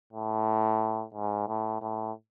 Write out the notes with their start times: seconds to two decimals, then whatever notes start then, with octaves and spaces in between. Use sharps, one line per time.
0.13 A2
1.14 G#2
1.48 A2
1.82 A2